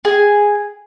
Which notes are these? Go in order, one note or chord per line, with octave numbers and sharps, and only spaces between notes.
G#4